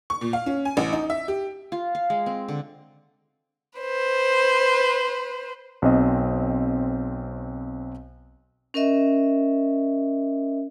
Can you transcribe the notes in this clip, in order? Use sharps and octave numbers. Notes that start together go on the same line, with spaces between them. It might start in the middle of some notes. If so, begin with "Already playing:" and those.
C#6
A#2
F5
C#4
G#5
A1
D#4
E5
G4
F4
F5
G#3
C4
D3
B4 C5
B1 C4 D#5
C#4 A#4 D#5 E5